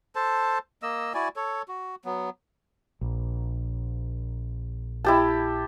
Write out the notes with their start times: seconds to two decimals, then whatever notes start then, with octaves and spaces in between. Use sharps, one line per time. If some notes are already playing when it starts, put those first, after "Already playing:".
0.15 A4 C5 A5
0.82 A#3 D#5 E6
1.14 E4 F#4 D5 G#5
1.36 A4 C#5
1.68 F#4
2.05 F#3 B3
3.01 A#1
5.05 E4 G4 A5